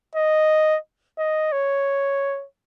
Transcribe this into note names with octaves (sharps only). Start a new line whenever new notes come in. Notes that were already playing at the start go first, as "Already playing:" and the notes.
D#5
D#5
C#5